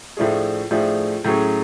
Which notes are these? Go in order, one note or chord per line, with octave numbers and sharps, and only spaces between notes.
A2 F3 A3 D4 G#4
A2 F3 A3 D4 G#4
A2 F#3 C#4 G#4 C#5